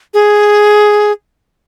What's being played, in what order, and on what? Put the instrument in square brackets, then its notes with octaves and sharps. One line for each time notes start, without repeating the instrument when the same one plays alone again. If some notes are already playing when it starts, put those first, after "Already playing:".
[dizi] G#4